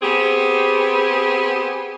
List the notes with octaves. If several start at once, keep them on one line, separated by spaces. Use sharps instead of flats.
B3 C4 G4 G#4